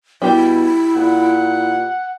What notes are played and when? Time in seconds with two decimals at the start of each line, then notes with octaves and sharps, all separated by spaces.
0.22 B2 G3 E4 G4
0.95 A#2 F#5